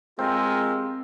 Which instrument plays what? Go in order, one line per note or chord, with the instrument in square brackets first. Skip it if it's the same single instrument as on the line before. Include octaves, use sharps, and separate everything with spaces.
[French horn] G#3 [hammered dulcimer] C4 [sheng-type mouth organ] F4 G4 A#4